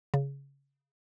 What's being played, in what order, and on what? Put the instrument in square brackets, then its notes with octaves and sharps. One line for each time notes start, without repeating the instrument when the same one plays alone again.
[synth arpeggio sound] C#3